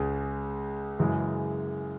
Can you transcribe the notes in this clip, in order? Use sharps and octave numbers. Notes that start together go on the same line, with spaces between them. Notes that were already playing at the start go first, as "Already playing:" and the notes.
Already playing: C#2 C#3 G#3
F#2 C#3 E3 G#3